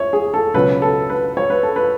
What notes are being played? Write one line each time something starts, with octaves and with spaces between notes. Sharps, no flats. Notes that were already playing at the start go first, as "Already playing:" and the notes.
Already playing: C#5 E5
G#4
A4
C#2 B2 F#3 C#4 B4
A4
B4
C#5
B4
A4
B4